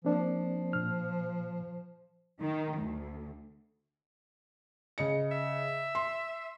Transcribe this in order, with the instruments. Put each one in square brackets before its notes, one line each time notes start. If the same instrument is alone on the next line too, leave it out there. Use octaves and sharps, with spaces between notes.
[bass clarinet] F3 [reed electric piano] A#3 C4 D4
[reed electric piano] A#2 F6
[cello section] D#3
D2
[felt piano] C#3 D#5 C#7
[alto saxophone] E5
[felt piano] C6